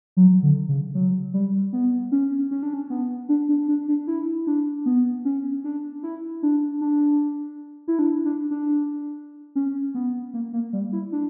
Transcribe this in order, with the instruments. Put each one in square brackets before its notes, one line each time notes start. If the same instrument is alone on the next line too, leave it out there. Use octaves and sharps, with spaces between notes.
[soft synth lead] F#3
D3
C#3
F#3
G3
B3
C#4
C#4
D4
C#4
B3
D4
D4
D4
D4
E4
D4
B3
C#4
D4
E4
D4
D4
E4
D4
D4
D4
C#4
B3
A#3
A#3
G3
E4
D4